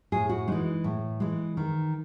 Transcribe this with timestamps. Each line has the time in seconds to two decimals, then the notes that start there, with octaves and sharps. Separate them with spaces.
0.12 A2 G#4
0.29 F#4
0.48 E3 G#3 D#4
0.84 A2
1.20 E3 G#3
1.57 D#3